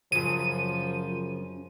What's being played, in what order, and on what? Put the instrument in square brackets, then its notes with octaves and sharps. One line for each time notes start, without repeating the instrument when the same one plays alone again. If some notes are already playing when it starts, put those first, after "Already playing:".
[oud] F#2 C#3 [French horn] F3 [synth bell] D#7